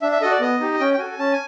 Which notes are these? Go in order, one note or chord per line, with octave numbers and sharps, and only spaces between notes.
D4 E5
E5
F#4 A4 D#5
D5
B3 D#5
D#4 G4
C#4 G5
G5
F#4 A4 G#5
C#4 A5
G#5